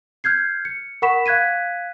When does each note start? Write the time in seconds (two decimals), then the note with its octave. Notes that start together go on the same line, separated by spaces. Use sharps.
0.24 F6 G6 G#6 C7
0.65 C#7
1.02 A#4 F#5 B5 C#6 B6 E7
1.26 F5 F#6 G#6 B6 D#7